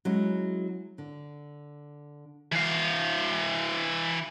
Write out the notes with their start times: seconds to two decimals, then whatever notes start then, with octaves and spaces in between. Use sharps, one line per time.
0.05 F#3 G#3 C#4 E4
0.98 D3
2.52 E3 F5